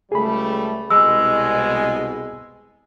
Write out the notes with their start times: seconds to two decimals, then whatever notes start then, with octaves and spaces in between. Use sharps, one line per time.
0.12 C#2 G3 A3 G#4 B5
0.91 C2 B2 G#3 G#5 E6